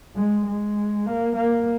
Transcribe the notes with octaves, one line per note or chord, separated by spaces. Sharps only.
G#3
G#3
A#3
A#3